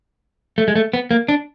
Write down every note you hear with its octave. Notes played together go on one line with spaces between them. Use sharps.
A3
G#3
A3
B3
A#3
D4